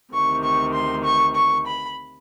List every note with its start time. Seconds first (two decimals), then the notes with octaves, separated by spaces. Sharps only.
0.13 D2 C3 D#3 C#6
0.44 C#6
0.74 C6
1.04 C#6
1.36 C#6
1.67 B5